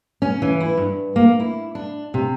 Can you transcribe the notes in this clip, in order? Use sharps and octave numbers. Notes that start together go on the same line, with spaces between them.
C#4
E3
E4
G2
A#3
E4
D4
C3